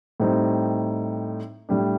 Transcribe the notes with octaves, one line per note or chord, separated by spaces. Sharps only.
A2 G3 C4 D#4
A2 G3 D4